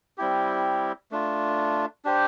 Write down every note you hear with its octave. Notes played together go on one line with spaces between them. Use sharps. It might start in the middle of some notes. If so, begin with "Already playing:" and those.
G3 C4 E4 G4
A3 D4 F4
D4 G4 C5